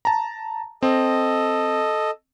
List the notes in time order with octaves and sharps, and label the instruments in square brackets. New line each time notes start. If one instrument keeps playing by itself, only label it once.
[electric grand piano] A5 A#5
[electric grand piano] C4 [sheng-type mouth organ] A4 D#5